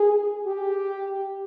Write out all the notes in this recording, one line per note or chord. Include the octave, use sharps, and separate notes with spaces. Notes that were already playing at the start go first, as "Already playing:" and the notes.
Already playing: G#4
G4